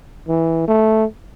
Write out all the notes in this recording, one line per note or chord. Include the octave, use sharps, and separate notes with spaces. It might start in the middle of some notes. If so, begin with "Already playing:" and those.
E3
A3